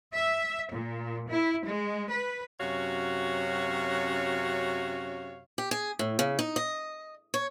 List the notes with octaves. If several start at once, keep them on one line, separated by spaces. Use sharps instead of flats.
E5
A#2
E4
G#3
B4
F#2 C3 C#4 F#4 C#5 F5
G4
G#4
A2
C#3
D#4
D#5
C#5